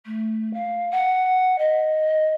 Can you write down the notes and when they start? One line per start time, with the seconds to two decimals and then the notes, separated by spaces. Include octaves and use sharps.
0.05 A3
0.53 F5
0.91 F#5
1.58 D#5